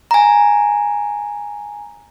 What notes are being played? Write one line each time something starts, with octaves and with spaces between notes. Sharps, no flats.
G#5 A#5